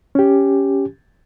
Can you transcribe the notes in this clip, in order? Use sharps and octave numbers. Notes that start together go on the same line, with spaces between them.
C#4 G4